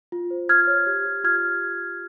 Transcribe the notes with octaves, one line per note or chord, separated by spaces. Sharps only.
F4
C5
F4 F6 G#6
C#5
G4
G4
F4 F6 G#6